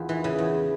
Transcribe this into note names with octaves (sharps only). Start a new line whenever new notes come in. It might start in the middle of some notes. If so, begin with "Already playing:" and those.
Already playing: E2 F4
E3
C#3
E2